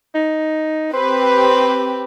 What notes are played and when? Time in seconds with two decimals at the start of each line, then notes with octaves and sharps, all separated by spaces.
0.15 D#4
0.93 C4 G4 B4 C5